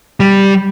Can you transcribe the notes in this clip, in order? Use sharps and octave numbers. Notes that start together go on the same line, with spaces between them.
G3